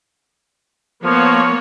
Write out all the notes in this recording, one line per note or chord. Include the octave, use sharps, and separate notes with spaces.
F3 A#3 B3 C#5